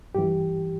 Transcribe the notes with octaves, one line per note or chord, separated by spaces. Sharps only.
G2 E3 G4